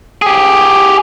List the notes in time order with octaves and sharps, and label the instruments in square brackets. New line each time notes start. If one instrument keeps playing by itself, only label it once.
[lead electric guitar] G4 G#4